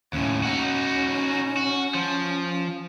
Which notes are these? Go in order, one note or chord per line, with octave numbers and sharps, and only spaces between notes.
D#2 A2 C#4
D#4 F#4
F#4
F3